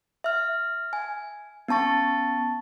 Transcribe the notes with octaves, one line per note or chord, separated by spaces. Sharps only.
E5 F6
G#5
B3 C#4 A5 C#6 A6